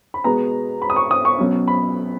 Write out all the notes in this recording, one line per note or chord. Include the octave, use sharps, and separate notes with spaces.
B5
B2 G#3 B3 A#5
B5
D#6
C#6
D#6
C#6
B2 F#3 C#4
B5